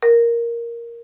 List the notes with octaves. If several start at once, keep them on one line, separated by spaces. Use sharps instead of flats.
A#4